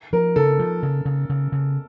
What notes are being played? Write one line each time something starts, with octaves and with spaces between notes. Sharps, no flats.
F3 A#4
C#3 A4
F3
C#3
C#3
C#3
C#3